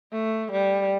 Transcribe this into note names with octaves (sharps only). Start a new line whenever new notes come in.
A3
G3